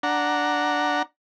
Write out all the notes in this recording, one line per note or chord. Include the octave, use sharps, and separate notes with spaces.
D4 F#5 A#5